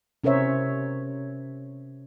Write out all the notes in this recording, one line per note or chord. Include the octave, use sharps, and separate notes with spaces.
C3 C#4 A#4 C5 C#5 E5